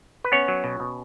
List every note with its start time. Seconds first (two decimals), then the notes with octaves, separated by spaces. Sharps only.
0.24 B4
0.32 B3 C#4 C#5
0.48 F#3
0.64 B2
0.80 B2